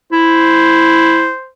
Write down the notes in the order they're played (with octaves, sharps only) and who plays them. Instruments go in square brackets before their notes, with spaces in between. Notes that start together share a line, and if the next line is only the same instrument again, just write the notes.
[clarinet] E4 [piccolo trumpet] C5